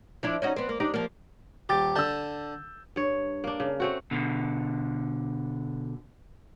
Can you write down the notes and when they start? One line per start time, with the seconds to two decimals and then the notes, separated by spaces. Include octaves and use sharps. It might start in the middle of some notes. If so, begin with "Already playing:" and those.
0.23 F3 D4 E4
0.42 C#4 D#4 F#4
0.56 B3 C4
0.69 A#3
0.80 D4 D#4 G4
0.94 F3 A#3
1.69 D#1 G4 G5 A6
1.96 D3 A5 E6 G6
2.96 G2 C#5
3.44 A#3 D4
3.60 C#3
3.80 A3 C4 F#4
4.11 B2 D3